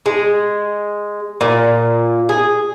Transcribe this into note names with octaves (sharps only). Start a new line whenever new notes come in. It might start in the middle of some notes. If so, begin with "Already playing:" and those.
G#3
A#2
G#4